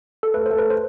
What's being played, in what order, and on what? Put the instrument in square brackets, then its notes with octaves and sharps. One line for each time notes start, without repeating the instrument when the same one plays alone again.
[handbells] A4
[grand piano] A3 [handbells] B4
[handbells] C5
[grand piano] A3
[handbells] B4
C5